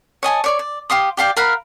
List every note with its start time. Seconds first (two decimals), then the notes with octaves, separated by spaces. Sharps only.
0.23 C#5 D#5 G#5 A5
0.44 C#5 D5 C#6
0.59 D5
0.90 G4 F5 C6 D#6
1.17 G4 D5 F5 G5
1.37 A#4 F5 F#5 B5